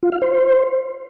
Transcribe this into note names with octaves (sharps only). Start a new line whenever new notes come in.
F4
F5
C5